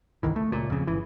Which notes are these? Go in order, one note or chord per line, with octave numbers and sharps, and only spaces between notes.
G1 C2 D#3 E3
A3
C#2 A#2
F2 C#3
G1 E3